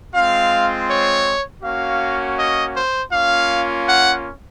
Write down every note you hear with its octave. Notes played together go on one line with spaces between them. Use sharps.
G#3 C4 F4 F5
C#5
A#3 C#4 F#4 F5
D#5
C5
A#3 C#4 F4 F5
F#5